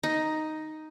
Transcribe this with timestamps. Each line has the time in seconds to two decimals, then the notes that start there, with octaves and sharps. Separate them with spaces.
0.03 D#4